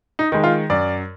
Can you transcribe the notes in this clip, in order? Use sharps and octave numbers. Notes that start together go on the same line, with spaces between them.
D#4
D#3 G#3
F4
F#2 D5